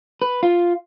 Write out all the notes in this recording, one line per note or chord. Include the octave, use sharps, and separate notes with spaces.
B4
F4